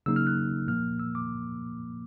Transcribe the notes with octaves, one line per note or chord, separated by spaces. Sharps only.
C#3 F#3 A#3 D#4 E6
F6
F#6
A#2 F3 A#3 F6
E6
D6